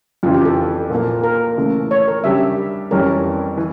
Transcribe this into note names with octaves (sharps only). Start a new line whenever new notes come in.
F2 C#3 E3 F4
G4
A4
A#2 F3 A#3
A#4
C#3 E3 A3
C#5
A#4
C#3 G3 D4 G4 E5
F2 E3 G3 C#4 A#4
E3